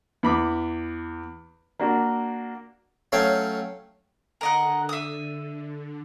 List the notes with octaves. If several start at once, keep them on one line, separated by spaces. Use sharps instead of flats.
E2 B5 D6
A#3 D4 F#4
F#3 A3 C#4 F5 G5 G#5
D3 A#4 D#5 F#5
E5 D#6